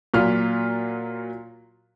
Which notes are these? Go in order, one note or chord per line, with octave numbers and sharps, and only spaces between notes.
A#2 F#3 F4 F6